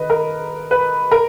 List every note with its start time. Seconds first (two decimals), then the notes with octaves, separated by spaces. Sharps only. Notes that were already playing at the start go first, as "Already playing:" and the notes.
Already playing: D#3 B4 D#5
0.10 A#4
0.71 B4
1.11 A#4